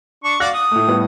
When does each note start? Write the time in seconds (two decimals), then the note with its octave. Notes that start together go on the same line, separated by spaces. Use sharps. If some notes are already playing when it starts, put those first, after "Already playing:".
0.24 D4 C#6
0.40 F#4 D5 F5 F#6 A#6
0.53 D#6
0.71 A2 A3
0.87 A2 G3 B3